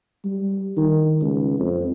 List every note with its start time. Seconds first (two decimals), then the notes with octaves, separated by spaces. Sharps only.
0.25 G3
0.77 D#3
1.21 C#2
1.59 F2